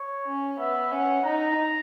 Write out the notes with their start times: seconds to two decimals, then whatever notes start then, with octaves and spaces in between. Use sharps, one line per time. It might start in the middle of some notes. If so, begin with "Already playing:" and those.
Already playing: C#5
0.26 C#4
0.59 B3 E5
0.92 C#4 F#5
1.25 D#4 A#5